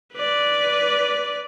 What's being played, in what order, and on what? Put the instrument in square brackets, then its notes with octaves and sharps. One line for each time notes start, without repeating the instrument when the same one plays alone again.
[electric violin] B4 D5